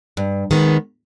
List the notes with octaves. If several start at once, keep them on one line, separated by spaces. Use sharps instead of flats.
G2
D#3 G#3 B3